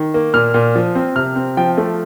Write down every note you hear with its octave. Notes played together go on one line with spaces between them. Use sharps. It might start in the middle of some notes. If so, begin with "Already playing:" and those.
Already playing: D#3
A#3
A#2 F6
A#2
F3
C4
C3 F6
C4
F3 G5
A3